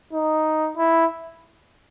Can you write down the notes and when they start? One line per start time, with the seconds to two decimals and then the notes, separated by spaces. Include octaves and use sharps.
0.13 D#4
0.77 E4